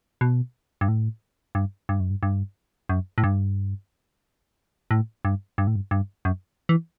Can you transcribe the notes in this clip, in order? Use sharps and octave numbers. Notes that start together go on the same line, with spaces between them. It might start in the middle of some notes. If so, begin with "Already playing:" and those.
B2
G2
A2
G2
G2
F#2
G2
G2
F#2
A2
G2
A2
G2
G2
A2
G2
G2
F#2
E3